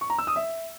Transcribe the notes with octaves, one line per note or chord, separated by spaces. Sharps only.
C#6
A#5
E6
D#6
E5